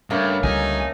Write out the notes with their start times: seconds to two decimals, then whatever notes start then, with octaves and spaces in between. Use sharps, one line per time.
0.10 G2 C#3 A3 A#3
0.44 C#2 D3 G3 D#4 G#5